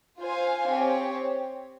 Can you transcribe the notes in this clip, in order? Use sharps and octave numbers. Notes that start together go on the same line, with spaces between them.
F4 C5 F5 G#5
C4 G4 C#5